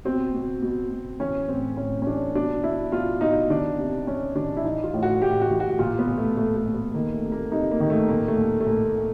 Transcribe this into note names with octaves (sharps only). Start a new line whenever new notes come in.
B2 C4
B2
B2
B2
E3 C#4
A2 C4
A2 C#4
C#4
E3 D4
B2 D4
B2 E4
B2 F4
B2 D#4
D#3 D4
C3
C3 C#4
D#3 D4
E4
E3 D#4
F4
A2
F#4
A2 G4
F#4
E3
F#4
A#2 F4
B3
A#2
A3
A#2 A3
A3
A#2
B3
D#3 A#3
A3
C3
A#3
C3 D#4
A#3
D#3
A3
A#2 A#3
A3
A#2
A#3
A3
A#2 A#3
A#2